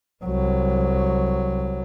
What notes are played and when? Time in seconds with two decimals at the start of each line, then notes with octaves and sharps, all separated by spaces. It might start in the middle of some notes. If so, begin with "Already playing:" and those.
0.25 C2 F#3